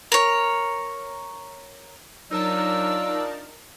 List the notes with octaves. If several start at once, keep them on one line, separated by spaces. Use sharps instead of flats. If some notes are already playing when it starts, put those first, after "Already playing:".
A#4 C#5
F#3 D4 D#4 F4 A#4 D5 A5 E6